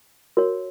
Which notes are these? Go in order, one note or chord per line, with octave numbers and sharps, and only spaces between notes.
F#4 A#4 C#5